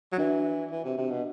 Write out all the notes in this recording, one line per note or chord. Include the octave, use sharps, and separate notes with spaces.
F#3
E3 D4 F#4
E3
C3
C3
B2